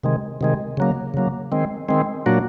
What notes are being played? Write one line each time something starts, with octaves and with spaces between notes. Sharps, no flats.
C3 D#3 G#3
C3 D#3 G#3
C#3 F#3 A#3
C#3 F#3 A#3
D#3 G#3 C4
D#3 G#3 C4
A#2 F#3 A#3 D4 F#4